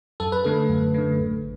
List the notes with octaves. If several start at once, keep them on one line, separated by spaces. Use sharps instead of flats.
F#2 A4
B4
D3 A3 A4
F#2
D3 A3
A1